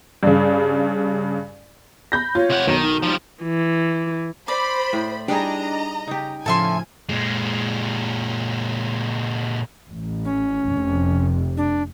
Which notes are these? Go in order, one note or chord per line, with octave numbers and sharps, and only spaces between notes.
G2 C#3
B5 G6 A#6
F4 C#5
C3 F#5
B1 D#3 D#7
D#4
F3 G3
E3
C5 D5 B5
A2
G3 D4 D#4 G#4 D#5 A#5
C#3 D#4 G4
A2 C#3 F3 A4 E5 G#5 C6
A#2 G#3
A1
C#4
F1 F2 C3
D4